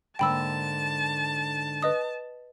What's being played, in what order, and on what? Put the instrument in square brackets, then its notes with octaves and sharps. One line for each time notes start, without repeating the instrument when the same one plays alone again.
[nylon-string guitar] G#2 D3 A#3 [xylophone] G5 B5 E6 [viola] A5
[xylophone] B4 D#5 D#6